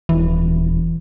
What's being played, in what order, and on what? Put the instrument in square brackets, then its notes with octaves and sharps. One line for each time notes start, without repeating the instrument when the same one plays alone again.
[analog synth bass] D#1 [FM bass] E3